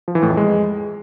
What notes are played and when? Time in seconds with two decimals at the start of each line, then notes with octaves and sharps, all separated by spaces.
0.08 F3
0.15 E3
0.22 A2
0.30 F2
0.37 G#3